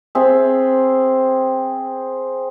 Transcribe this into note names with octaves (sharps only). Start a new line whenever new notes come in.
C4 G#4 E5